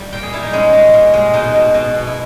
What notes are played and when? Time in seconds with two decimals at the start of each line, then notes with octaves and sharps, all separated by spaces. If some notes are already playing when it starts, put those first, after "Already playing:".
Already playing: G3
0.13 A#2 G5
0.23 G#4
0.33 G3 E4
0.43 D#4
0.53 G#3 C#4
0.73 G#3
0.94 A#2
1.14 G#3
1.34 B2 D#4
1.54 B2
1.74 B2
1.94 B2
2.07 E4